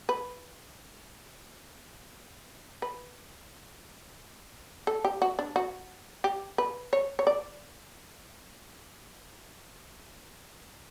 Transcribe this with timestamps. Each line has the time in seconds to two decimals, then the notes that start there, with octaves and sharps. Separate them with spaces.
0.09 B4
2.82 B4
4.87 A4
5.05 G4
5.22 F#4
5.39 D4
5.56 F#4
6.24 G4
6.58 B4
6.93 C#5
7.19 C#5
7.27 D5